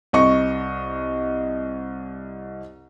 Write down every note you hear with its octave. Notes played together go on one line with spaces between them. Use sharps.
C2 D#5 C#6